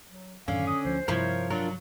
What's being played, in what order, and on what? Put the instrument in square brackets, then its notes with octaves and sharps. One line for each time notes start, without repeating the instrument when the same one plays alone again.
[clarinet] F#3
[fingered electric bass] F#2 A2 D#3 [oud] D3 [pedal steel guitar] C#4 [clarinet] F5
[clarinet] D#6
[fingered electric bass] D2 F3 [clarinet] C5
[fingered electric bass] G2 C3 G3 [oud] F3 E4 F4 [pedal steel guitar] A#4 C#5
[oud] F#3 [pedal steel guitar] D4 F4 A#4